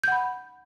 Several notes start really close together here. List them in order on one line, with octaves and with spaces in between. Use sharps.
G6 F#5 B5